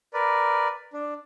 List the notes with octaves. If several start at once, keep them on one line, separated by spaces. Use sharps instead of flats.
A#4 B4 D5
D4